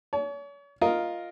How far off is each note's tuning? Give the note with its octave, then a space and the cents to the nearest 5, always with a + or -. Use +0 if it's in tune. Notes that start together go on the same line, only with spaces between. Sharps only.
C#5 +40 A5 -45
F4 +0 A#4 +5 D#5 +0